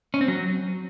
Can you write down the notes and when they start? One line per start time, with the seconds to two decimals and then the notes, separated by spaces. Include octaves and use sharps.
0.14 C#4
0.21 C4
0.28 F#3